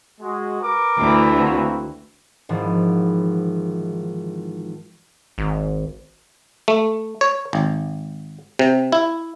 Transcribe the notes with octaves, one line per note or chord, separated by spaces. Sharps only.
G#3 F#4
A#4 B4 D6
D2 E3
A#3 C4 F#4
G#1 G#2 E3 F3
G#1
A3
C#5
G#1
C3
E4